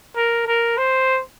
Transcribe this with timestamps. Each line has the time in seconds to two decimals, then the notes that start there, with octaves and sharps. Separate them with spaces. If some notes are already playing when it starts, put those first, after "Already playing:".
0.16 A#4
0.47 A#4
0.77 C5